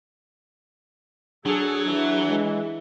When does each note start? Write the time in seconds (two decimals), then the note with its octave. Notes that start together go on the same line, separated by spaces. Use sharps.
1.46 F#3 D4 G#4 A4
1.87 E3
2.30 G#3